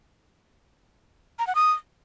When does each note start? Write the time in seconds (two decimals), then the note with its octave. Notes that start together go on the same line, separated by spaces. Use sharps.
1.39 A#5
1.47 F#5
1.55 D#6